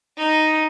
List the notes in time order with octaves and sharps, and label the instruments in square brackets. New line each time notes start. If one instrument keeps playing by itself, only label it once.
[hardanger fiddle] D#4